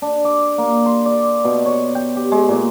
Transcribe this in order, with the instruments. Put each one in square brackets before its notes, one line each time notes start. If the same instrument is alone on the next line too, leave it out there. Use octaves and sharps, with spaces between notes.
[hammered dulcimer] D4
D6
A#3
C6
D5
B2
C#5
G5
G4
G#3
A#2